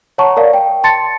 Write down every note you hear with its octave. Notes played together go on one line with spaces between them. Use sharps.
C#5 F#5 A5 A#5 C#6
A#4 D5 F5
G5
A5 C6 A6 C#7